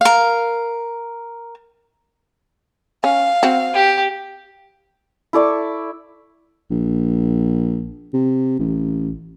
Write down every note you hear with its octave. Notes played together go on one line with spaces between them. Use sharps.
A#4 F5
C#4 F5
C4 F#4
G4
E4 A4 D5 C#6
A#1
C3
A1